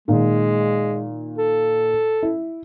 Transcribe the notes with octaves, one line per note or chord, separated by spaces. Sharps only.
A#2 D#3 G#3
A4
E4